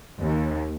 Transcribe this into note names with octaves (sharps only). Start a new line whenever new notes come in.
D#2